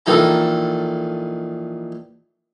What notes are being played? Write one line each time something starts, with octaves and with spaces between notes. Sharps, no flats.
A#1 D#3 E3 A4 A#5